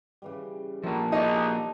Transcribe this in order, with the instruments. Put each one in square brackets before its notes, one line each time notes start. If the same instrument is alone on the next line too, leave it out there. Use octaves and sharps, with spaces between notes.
[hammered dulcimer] C#3 E3 G3
[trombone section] A#1 [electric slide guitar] F3 A#3 [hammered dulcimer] D4 E4 A4
[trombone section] B1 G#4 [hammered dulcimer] C3 D4 [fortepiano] D#4